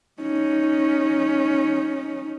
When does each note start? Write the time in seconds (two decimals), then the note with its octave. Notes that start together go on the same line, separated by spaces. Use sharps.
0.21 C#4 D#4